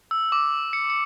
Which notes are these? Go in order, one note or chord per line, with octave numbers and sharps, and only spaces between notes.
E6
D6
C#7
C#7